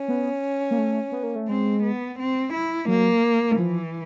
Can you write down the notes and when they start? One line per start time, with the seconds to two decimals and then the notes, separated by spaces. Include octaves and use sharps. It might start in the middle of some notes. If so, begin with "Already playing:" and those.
Already playing: C#4
0.08 B3
0.71 A#3
0.78 A3
1.12 B3
1.23 A#3
1.36 A3
1.49 G#3 C4
1.83 B3
2.18 C4
2.53 E4
2.88 F#3 A#3
3.58 E3 F3